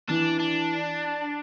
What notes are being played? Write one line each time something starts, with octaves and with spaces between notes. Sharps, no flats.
E3 D4
D4